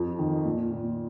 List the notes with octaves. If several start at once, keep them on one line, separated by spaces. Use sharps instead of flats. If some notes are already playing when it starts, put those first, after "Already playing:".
Already playing: F2
D#3
A#2
A#2